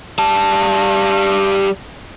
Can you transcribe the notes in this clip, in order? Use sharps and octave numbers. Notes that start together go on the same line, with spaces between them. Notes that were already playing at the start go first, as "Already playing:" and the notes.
G3 A5